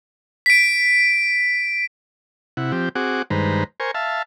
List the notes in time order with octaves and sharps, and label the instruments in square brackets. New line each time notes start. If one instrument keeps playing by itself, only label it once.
[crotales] B6 D7
[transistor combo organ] C3 E4 F#5
F3 C4 G4
C4 F#4 G#4 F#5 D6
G2 D#3 G#3 B4 C5 A#5
A#4 C5 G#5 C#6
E5 F5 A5